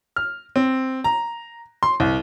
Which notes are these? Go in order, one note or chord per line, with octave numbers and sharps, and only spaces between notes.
F6
C4
A#5
C6
C2